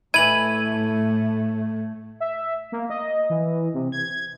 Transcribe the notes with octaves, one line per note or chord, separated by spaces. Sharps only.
A2 E3 A3 E4 G#6 D#7 F#7
E5
A#3
D#5
E3
C3
G#6